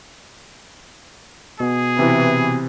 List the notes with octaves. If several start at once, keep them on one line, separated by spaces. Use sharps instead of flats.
B2 B3 G#4
C3 E3